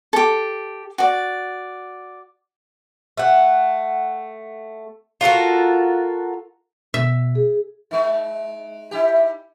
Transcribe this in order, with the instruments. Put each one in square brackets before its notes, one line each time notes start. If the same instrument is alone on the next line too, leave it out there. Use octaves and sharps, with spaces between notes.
[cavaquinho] G4 A4
F#4 D5
[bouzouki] A3 F#5
F4 F#4 A4 A#4
[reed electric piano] B2 [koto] E5
[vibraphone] G#4
[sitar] G#3 D#4
D#4 E4 G4